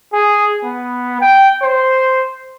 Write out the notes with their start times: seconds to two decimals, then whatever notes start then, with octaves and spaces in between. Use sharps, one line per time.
0.13 G#4
0.64 B3
1.21 G5
1.62 C5